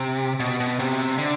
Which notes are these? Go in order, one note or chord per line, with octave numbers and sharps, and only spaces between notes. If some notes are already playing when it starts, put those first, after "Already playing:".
Already playing: C3
B2
B2
C3
D3